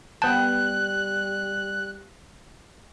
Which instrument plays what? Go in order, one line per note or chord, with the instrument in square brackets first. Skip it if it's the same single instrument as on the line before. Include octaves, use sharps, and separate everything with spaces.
[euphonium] G3 [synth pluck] B3 G5 [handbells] A5 [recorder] F#6